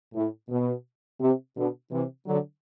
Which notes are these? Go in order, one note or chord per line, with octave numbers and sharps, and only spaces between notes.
A2
B2
C3
B2 D3
C3 E3
D3 F#3